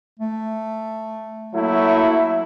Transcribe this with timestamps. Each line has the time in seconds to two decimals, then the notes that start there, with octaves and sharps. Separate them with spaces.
0.19 A3
1.54 F#3 A3 A#3 E4